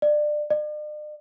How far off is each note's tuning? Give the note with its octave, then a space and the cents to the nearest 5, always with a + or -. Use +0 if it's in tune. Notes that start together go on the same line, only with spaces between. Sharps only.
D5 +25
D5 +45